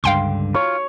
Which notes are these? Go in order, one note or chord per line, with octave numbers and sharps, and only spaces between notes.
C#2 G2 D3 F5 G5 C6
F4 C#5